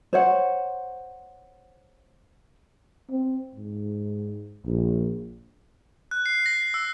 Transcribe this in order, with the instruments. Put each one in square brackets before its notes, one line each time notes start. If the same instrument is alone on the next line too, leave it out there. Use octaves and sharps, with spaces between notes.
[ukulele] C5 C#5 F#5
[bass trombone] C4
G#2
A#1
[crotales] F#6
C7
A#6
E6